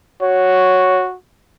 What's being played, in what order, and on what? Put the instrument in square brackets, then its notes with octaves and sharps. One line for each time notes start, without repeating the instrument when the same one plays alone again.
[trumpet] F#4 [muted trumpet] C#5